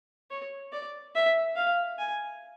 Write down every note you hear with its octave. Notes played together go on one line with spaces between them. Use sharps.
C#5
D5
E5
F5
G#5